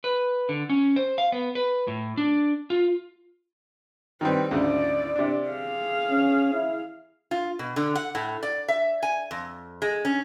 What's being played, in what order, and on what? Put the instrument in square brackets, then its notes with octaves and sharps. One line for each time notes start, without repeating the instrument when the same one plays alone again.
[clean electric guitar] B4
D3
C#4
C5
F5
B3
B4
A2
D4
F4
[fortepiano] D#3 G3 C4 [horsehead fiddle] B4
[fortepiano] D2 G#2 C#3 [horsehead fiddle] E4 D5
[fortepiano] C3 D4
[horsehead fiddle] G#4 F5
[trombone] C#4
E4
[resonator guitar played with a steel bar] F4
B2
D3
F#5
A2
D5
E5
G#5
F2
G#3
C#4